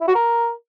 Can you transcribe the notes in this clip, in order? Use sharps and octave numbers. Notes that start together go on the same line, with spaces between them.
E4
F#4
A#4